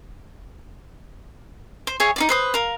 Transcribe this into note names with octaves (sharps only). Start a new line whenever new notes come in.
C5
G#4 C#5 E5 G#5
D#4 F4 D5
B4 C5 D#6
A#4 F5